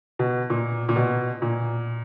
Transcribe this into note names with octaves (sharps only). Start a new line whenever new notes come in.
B2
A#2
A#2
B2
A#2